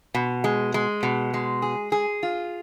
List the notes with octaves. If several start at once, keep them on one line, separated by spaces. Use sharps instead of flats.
B2
G#3
G#3
B2
G#3
G#4
G#4
F4